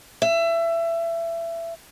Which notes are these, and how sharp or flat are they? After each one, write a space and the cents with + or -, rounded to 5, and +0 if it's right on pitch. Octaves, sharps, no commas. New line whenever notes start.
E5 +25